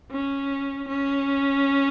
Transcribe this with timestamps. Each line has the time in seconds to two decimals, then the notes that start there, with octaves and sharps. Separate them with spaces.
0.11 C#4
0.88 C#4